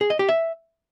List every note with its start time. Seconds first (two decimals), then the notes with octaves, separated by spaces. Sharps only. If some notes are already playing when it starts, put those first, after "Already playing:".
0.01 G#4
0.10 D#5
0.19 G4
0.29 E5